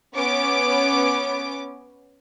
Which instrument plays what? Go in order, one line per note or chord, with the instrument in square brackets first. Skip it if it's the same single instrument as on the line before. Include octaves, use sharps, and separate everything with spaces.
[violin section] B3 C#4 D6 D7